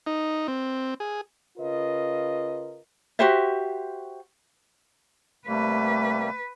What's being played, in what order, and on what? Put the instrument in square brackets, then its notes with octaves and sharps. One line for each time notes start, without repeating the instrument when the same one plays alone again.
[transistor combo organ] D#4
C4
G#4
[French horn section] C#3 F4 A#4 B4 D#5
[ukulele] F#4 G4 C5 E5
[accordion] C3 G3 A#3 [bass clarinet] A3 [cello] B4